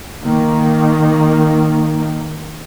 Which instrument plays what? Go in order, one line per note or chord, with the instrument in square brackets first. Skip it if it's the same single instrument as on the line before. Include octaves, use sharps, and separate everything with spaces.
[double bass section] D#3 A#3